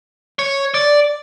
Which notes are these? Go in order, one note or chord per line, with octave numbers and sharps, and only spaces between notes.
C#5
D5